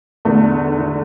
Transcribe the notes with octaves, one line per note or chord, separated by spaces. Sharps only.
E2 D3 A3
D3